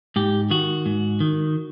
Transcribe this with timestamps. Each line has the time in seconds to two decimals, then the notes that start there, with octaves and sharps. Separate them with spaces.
0.16 G#2 G4
0.50 D#3 F#4
0.86 G#2
1.20 D#3